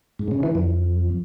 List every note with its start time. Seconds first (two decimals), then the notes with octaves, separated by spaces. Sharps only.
0.19 G#2
0.31 C#3
0.43 E3
0.55 F2